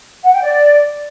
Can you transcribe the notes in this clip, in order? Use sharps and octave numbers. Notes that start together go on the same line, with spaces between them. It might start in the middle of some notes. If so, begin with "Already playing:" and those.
F#5
G5
D5